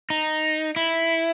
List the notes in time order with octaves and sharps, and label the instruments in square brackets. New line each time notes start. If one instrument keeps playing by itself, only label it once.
[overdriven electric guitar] D#4
E4